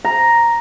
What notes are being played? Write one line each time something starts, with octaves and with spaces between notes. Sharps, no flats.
A#5